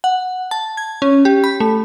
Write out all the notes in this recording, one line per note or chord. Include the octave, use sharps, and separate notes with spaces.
F#5
A5
G#6
C#4
G4
B5
A3